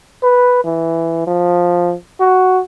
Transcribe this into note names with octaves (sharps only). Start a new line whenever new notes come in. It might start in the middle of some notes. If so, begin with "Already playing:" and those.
B4
E3
F3
F#4